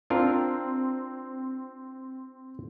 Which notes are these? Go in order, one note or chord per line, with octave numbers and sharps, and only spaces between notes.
C4 D4 F4 A#4